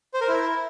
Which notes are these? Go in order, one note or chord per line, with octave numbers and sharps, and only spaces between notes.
C5
A#4
E4